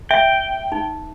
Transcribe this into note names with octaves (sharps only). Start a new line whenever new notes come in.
E5 G5
D#4